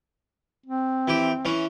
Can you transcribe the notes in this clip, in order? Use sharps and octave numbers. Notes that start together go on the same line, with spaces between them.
C4
E3 G4
E3 C#4